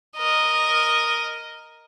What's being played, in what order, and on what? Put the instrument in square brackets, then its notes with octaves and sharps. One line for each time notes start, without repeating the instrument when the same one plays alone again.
[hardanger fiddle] A#4 D#5